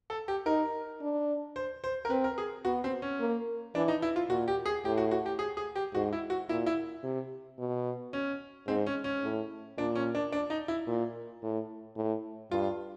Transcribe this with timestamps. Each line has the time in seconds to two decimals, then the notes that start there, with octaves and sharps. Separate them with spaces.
0.10 A4
0.28 G4
0.46 D#4 A#4
1.01 D4
1.56 C5
1.84 C5
2.05 A#4
2.10 C4 B4
2.24 A#4
2.38 G#4
2.65 B3 F#4
2.84 C4
3.02 C#4
3.20 A#3
3.75 E3 D4
3.88 D#4
4.02 E4
4.16 F4
4.29 A#2 F#4
4.48 G4
4.66 G#4
4.85 A2 G4
4.98 F#4
5.11 F#4
5.26 G4
5.39 G#4
5.57 G#4
5.76 G4
5.94 G#2 F#4
6.13 E4
6.30 F#4
6.48 A#2 E4
6.66 E4
7.03 C3
7.59 B2
8.13 C#4
8.67 G#2 C4
8.86 C#4
9.04 C#4
9.23 A2
9.78 A#2 D4
9.95 C#4
10.15 D4
10.32 D4
10.50 D#4
10.68 E4
10.87 A#2
11.43 A2
11.97 A2
12.51 G2 F4